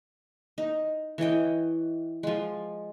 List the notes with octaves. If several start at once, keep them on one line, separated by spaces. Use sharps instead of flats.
D#4
E3 C#5 D#5 G5
F3 G#3